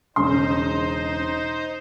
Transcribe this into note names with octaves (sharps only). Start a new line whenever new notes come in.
E1 C#3 D#4 C5 C6